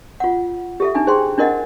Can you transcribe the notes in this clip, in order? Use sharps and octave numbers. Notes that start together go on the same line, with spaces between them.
F4 F#5
G4 A4 E5
D4 D#4 G#5
G#4 C5 G5 C6
D4 E4 A#4 D#5 F#5